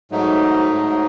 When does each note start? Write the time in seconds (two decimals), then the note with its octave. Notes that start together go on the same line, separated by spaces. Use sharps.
0.11 G#2 F#3 A3 D#4
0.71 G#2 F#3 A3